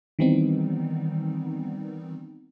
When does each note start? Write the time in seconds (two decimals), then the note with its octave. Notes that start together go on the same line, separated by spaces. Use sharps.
0.19 D#3 E3 G3 B3 C4 D#4